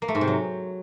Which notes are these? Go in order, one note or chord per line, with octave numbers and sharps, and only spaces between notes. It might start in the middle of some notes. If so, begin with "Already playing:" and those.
A#3
A3
G#2
C3
F#3